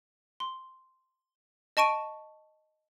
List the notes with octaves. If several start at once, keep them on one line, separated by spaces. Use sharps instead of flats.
C6
D#5 A5 C#6 D7 D#7